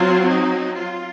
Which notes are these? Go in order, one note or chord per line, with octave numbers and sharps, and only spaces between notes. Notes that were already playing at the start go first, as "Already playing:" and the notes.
Already playing: F#3 C4 F4
D#4
F4